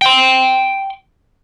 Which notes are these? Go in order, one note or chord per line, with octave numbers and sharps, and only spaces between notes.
G5 C6